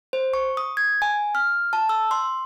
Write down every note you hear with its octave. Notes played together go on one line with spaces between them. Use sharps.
C5
C#6
D#6
G#6
G#5
F6
A5
E6
C6